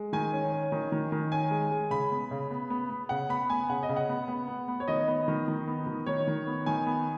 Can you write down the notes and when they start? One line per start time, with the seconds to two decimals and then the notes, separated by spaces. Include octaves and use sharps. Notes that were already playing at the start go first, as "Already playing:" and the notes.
Already playing: G#3
0.13 D#3 G#5
0.33 C#4
0.52 C#4
0.72 D#3
0.92 D#3
1.12 D#3
1.32 C#4 G#5
1.51 G#3
1.71 G#3
1.90 C#3 B5
2.11 B3
2.31 C#3
2.51 B3
2.70 B3
2.90 B3
3.09 C#3 F#5
3.29 B3 B5
3.50 B3 G#5
3.69 C#3 F#5
3.83 D#5
3.89 C#3
3.96 F#5
4.09 B3
4.28 B3
4.48 B3
4.68 B3
4.80 C#5
4.88 D#3 D#5
5.08 B3
5.28 D#3
5.48 D#3
5.67 B3
5.87 D#3
6.06 D#3 C#5
6.27 D#3
6.47 B3
6.66 D#3 G#5
6.86 B3